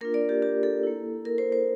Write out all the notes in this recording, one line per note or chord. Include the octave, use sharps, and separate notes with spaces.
A#3 D4 F4 A#4
D5
G4
G4
A4
A#3 E4
A#4
C5
C5